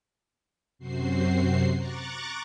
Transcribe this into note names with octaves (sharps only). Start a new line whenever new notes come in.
F#2 C3 C4 F#4 C7
A#5 C#6 D6 F#6 A6